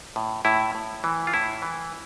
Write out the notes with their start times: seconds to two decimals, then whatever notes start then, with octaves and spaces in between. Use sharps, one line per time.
0.16 A2
0.45 A2 E4
0.75 A2
1.04 E3
1.27 F4
1.34 A2 E4
1.62 E3